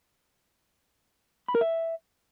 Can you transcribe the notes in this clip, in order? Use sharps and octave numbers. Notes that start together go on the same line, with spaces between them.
B5
A#4
E5